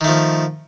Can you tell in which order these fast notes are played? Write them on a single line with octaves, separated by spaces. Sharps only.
D#3 A3 F3